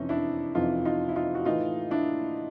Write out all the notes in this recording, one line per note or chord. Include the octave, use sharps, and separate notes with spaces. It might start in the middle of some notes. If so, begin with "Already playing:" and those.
Already playing: F2 C3 E3 C#4 D#4
D4 E4
F2 C3 E3 D#4 F4
D#4 F4
E4
D#4 F4
F#4
A2 E3 D#4 F4
D4 E4